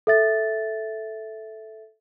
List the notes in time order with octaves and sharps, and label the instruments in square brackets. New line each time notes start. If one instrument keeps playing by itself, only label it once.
[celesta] A4 E5 A6